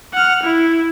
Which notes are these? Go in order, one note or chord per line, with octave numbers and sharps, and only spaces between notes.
F#5 F6
E4